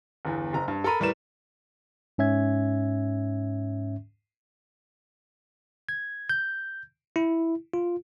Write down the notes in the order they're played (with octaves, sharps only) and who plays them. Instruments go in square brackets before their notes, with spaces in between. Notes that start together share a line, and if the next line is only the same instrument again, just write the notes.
[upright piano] G1 E2
F#1 A#5
G2
A4 A#4 A#5 B5 D#7
A2 G3 A#4 B4 E7
[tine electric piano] G#2 C#4 E5 G#6
G#6
G6
E4
F4